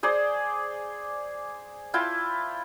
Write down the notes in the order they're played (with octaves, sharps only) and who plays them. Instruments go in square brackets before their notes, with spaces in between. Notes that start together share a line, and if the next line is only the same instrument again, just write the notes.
[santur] G#4 C5 D5
E4 F4 G5 A5